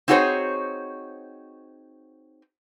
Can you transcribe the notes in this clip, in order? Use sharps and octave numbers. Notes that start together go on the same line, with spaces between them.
C4 D#4 F#4 G#4 C5 C#5